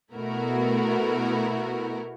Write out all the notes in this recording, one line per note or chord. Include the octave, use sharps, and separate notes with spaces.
B2 A3 B3 E4 F#4 A#4